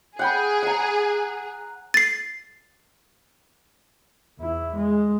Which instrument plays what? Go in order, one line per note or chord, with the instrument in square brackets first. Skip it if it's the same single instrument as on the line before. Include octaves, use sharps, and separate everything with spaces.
[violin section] G#4 [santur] F#5 G5 B5
[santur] F#5 A#5
[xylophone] A6 C7
[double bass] E2 E4
G#3